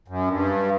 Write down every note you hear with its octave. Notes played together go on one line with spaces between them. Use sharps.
F#2
G2